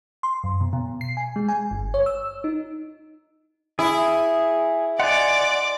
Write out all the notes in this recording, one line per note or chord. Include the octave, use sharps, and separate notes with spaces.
C6
F#2
B2
B2
C7
G#5
G#3
G#5
G1
C#5
E6
D#4
E4 G#4
D5 D#5 F#5 G#5 C6 D6